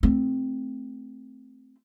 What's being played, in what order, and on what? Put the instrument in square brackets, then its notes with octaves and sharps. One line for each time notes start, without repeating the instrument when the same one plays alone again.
[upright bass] A3 C4